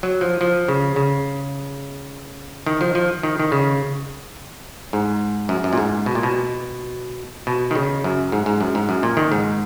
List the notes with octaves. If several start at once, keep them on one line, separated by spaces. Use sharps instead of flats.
F#3
F3
F3
C#3
C#3
D#3
F3
F3
D#3
D#3
C#3
G#2
F#2
F#2
A#2
G#2
B2
A#2
B2
B2
D#3
C#3
F#2
G#2
G#2
F#2
G#2
F#2
A#2
D#3
G#2